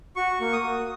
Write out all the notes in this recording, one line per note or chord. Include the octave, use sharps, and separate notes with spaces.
F#4 C#6
A#3
D#6
F#4